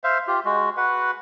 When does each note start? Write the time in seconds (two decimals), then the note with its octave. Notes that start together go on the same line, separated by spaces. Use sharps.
0.04 C5 E5 F5
0.28 F4 G4
0.45 G#3 F#4
0.77 F#4 B4 F#5